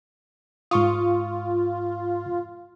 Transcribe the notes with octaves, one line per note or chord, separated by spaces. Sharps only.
G#2 F4 C#6 D#6